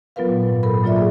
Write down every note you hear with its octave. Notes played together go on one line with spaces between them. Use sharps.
F#3 B3 F4 A#4 B4 F5
A#2
G#2
A4 A#4 B5
F#3 A#3 F4 D5 E5
G#4 D5